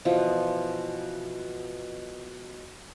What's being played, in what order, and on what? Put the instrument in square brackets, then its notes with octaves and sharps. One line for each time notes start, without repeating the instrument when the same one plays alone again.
[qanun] B2 E3 F3